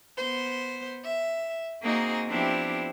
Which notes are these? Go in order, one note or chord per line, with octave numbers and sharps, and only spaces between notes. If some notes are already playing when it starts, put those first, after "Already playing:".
B3 C5
E5
A#3 C4 D#4 F#4 G#4
F3 B3 C4 D4 E4 G4